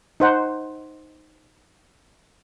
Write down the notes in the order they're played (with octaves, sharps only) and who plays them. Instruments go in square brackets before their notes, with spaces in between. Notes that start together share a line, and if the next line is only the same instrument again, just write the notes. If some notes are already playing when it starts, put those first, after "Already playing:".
[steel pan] D#4 C5 F#5